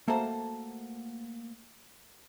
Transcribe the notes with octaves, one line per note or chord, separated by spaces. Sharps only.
A3 A#3 F#4 A4 C5 A5